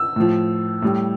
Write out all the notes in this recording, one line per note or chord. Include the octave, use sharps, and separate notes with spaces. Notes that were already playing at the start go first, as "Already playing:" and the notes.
Already playing: E6
A2 F3
A2 G3